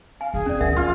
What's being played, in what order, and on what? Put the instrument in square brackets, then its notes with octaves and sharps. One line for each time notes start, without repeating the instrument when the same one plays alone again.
[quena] F5 [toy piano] G#5
[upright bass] D#1 D2 [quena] G#4
[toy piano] C#4 D5
[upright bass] D2 E3 [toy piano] A#4 E5 F#5
[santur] F4 [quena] F6